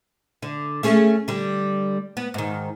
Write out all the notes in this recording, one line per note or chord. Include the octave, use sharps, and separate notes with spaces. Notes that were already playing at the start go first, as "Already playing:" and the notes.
D3
A3 C#4 G#4
D3 G3
B3
G#2 D#3